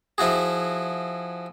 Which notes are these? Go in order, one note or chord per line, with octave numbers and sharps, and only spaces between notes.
F3 E4 F#4 G#4